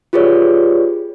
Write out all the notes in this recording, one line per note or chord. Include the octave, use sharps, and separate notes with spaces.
F4 G4 G#4 B4 C#5 D5